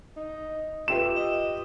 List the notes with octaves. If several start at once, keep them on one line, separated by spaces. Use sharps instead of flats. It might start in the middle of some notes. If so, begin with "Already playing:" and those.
D#4
F4 G4 B4 E5 E7
D#5